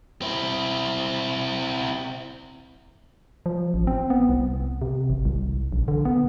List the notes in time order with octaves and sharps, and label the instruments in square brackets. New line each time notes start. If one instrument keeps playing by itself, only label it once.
[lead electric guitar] C4 E4
[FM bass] F3
A1
C4
B3
C2
C3
G#1
C2
A#1
D3
B3